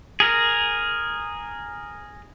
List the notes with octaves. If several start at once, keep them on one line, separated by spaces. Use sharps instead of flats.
G#4 A#4